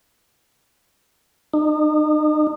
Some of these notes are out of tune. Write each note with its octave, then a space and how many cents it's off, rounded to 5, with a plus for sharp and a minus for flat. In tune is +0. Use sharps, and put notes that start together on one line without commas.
D#4 -40